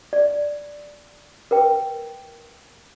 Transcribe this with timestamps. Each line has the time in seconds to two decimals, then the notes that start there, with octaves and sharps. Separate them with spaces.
0.13 D5
1.51 A#4 B4 G5